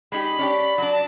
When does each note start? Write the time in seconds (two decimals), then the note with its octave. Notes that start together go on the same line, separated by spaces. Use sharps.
0.12 G#3 D#4 G4 B5
0.39 C#4 D4 G4
0.78 F#3 D4
0.92 A5